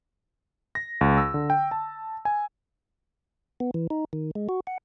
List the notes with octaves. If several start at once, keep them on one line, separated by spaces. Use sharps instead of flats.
A#6
C#2
E6
D3
G5
A5
G#5
B3
E3
D#4
D#3
G#3
F#4
F#5